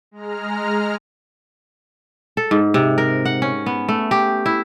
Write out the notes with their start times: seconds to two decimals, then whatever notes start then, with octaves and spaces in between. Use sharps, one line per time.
0.11 G#3 A#5 F6
2.37 A4
2.51 G#2
2.74 C3
2.98 A#4
3.25 F#5
3.42 C#4
3.66 B3
3.89 A3
4.11 G4
4.46 E4